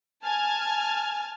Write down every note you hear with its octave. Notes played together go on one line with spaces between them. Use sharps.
G#5 A5 F6